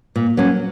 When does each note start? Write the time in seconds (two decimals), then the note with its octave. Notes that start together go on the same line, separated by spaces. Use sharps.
0.16 A#2
0.37 F#3 A#3 C#4